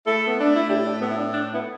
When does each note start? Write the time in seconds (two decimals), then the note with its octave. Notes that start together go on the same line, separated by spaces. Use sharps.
0.05 A3 E4 A4
0.27 B3
0.37 A3 D4
0.55 E4
0.68 A2 D4 G4
0.85 D4
1.00 A2 B3
1.10 E4
1.16 D4
1.32 A3 D4
1.53 B3 E4